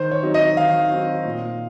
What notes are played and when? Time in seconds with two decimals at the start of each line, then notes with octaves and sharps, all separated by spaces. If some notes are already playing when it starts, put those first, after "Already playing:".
Already playing: D#3 C5
0.11 C#5
0.23 F#3 C4 D#4
0.34 D#5
0.57 D#3 F5
0.91 F#3 C4 D#4
1.25 A#2